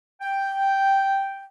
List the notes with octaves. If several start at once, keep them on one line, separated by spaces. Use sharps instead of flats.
G5